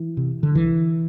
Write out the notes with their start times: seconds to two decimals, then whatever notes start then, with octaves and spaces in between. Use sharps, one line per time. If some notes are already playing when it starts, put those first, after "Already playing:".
Already playing: E3
0.17 C3
0.43 D3
0.55 C2 E3